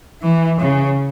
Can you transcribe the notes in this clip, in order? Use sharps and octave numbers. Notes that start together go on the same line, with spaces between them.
E3
C#3